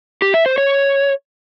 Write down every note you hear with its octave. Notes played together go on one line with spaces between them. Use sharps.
G4
E5
C5
C#5